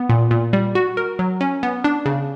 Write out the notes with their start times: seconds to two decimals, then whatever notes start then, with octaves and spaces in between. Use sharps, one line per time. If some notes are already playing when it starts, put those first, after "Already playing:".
Already playing: B3
0.09 A#2
0.31 A#2
0.53 G3
0.75 F#4
0.97 A#4
1.19 F#3
1.41 C#4
1.63 B3
1.84 D4
2.06 C#3